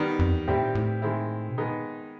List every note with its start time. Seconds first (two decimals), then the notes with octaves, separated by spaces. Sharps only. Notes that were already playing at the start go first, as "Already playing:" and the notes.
Already playing: D#3 G3 B3
0.19 F2
0.34 E2
0.48 A2 D#3 G3 C4 E4 G4
0.61 A#2
0.75 A2
1.02 D#3 G#3 C4 E4
1.49 B2
1.57 A#2 D#3 G#3 B3 D#4